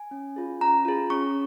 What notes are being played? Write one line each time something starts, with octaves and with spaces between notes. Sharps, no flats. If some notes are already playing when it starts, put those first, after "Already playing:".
Already playing: G#5
C#4
F4 G#4
C#4 A#5
F4 G#4
C#4 C#6